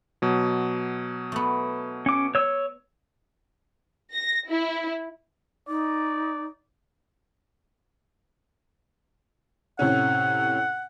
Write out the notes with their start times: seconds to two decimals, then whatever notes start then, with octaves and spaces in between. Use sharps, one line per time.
0.22 B2 F#3
1.32 A3 B3
2.06 C#4 D6
2.35 C#5 E6
4.12 A#6
4.49 E4
5.68 D#4 D5
9.79 A2 C3 C#4 F#5